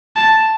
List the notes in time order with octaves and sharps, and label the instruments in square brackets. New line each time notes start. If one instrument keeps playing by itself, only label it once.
[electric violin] A5